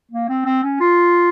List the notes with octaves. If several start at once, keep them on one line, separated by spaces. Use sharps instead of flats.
A#3
C4
C4
C#4
F4